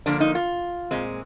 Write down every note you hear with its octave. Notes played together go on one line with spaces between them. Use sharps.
D3 F3 A#3 D4
D#4
F4
A#2 G#3 C4